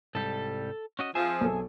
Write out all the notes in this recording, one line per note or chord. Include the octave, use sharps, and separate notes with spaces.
C2 G#2 G3 A4
C#4 F#4 D#5
F3 C4 G#4 E5 G#5
B1 A4